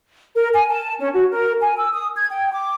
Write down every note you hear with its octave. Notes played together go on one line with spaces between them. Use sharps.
A#4
G#5
A5
C#4
F#4
A#4
G#5
E6
D#6
G#6
G5
D6